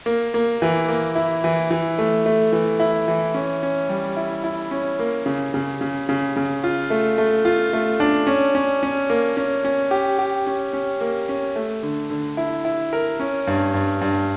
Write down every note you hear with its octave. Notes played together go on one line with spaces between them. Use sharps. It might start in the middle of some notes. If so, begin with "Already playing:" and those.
A#3
A#3
E3
A#3
E4
E3
E3
A3
A3
E3
E4
E3
C#4
C#4
G3
E4
E4
C#4
A#3
C#3
C#3
C#3
C#3
C#3
F4
A3
A3
F4
A3
D4
C#4
C#4
C#4
A#3
C#4
C#4
G4
G4
C#4
C#4
A#3
C#4
A3
D3
D3
E4
E4
A#4
C#4
G2
G2
G2